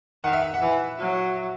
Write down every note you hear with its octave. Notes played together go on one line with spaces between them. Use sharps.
D#3 F#5
E5
F#5
F#5
E3 E5
F#3